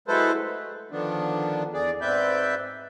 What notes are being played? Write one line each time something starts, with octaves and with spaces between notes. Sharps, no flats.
F#3 G#3 E4 A4 B4 C5
A3
D3 D#3 F3 B3 D4
E2 G#4 D5
G#2 C4 B4 D5 E5 G6